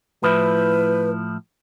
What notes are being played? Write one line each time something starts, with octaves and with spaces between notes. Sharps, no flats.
A2 F3 E4 B4